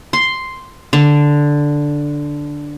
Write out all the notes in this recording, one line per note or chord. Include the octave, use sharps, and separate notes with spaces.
C6
D3